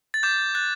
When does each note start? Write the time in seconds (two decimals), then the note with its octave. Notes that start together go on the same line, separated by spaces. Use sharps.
0.14 A6
0.23 D6 G6
0.55 F#6 A6